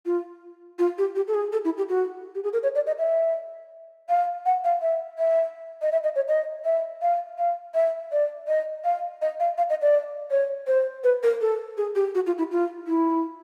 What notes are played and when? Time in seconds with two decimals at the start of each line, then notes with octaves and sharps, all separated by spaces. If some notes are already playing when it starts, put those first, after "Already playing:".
0.06 F4
0.79 F4
0.98 G4
1.16 G4
1.28 A4
1.34 G#4
1.52 A4
1.65 E4
1.78 G4
1.89 F#4
2.35 G4
2.44 G#4
2.53 A#4
2.63 C#5
2.75 D5
2.87 D#5
2.98 E5
4.09 F5
4.46 F#5
4.64 F5
4.82 E5
5.18 E5
5.82 D#5
5.92 E5
6.04 D#5
6.16 C#5
6.28 D#5
6.65 E5
7.02 F5
7.38 F5
7.74 E5
8.12 D5
8.47 D#5
8.84 F5
9.22 D#5
9.40 F5
9.58 F5
9.70 D#5
9.82 D5
10.31 C#5
10.67 C5
11.04 B4
11.23 A#4
11.41 A4
11.77 G#4
11.95 G4
12.15 F#4
12.26 F4
12.38 E4
12.51 F4
12.87 E4